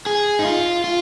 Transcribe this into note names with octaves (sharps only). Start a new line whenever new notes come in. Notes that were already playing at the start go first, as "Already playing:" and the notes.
G#4
D#4
F4
F4